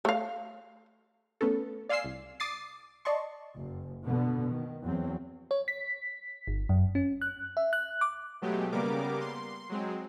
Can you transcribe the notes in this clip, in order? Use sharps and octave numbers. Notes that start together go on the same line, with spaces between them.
A3 F5
A3 B3 C#4 A4
D5 F5 G#5 C6 E6 C7
C2
D6 D#6 A6 C7
D5 D#5 A5 C6 C#6
F#1
B2 D3 B3
D#3
E2 F#3 C4
C#5
B6
G1
F#2
C#4
F#6
E5
F#6
D6
B2 F#3 G#3 A3 G4
C#3 G3 A#3 B3 A#4 D6
C6
F#3 G#3 C4